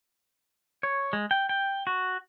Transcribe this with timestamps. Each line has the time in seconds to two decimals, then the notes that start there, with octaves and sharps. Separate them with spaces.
0.83 C#5
1.13 G#3
1.31 G5
1.49 G5
1.87 F#4